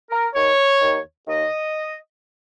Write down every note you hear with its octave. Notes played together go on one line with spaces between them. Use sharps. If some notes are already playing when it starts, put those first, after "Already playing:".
A#4
D#2 D#3 C#5
D#2 D#3
D#2 D#3 D#5